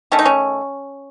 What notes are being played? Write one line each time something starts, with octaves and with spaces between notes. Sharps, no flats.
D#3 A3 C#4
D#4
C#4